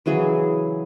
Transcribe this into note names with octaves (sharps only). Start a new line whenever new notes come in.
C#3 E3 F#3 G#4